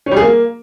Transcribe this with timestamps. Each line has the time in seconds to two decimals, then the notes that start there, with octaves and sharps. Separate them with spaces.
0.06 C#4
0.11 G3
0.17 G#4
0.22 A#3